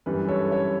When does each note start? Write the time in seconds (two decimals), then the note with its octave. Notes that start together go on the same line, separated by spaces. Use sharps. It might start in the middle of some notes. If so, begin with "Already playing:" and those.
0.06 G1 F#2 E3 G3 B4
0.29 A4 C#5
0.51 C#5 E5